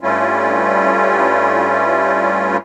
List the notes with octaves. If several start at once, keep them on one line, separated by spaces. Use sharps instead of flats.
G2 G3 A3 C#4 E4 F4